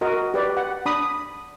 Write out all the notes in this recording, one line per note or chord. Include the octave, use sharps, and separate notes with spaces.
F#4 A#4 D#5
G4 B4 D5
F#5
D4 B5 D#6